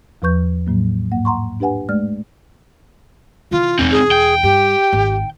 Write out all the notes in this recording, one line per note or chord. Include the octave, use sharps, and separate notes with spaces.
E2 F3 B4 C#6 G6
A2 F#3 A#3
G#2 A#3 F#5
F#5 A#5 C6 C#6
D4 G4 B4 F#5 G#5
G#3 A3 D5 F6
C3 E3 F4
E1 E2 C4 D#4
G#4
G5
G2 G4
G#1 D#4